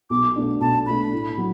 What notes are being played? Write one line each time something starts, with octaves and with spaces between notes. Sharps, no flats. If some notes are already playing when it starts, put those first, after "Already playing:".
B1 D6
B2 A3 D4
B1 A5
B2 A3 D4 B5
A2
F#3